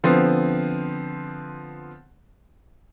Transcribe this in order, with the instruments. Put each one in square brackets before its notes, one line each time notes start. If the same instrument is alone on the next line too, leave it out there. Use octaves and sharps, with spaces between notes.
[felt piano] D3 F3 B3 C4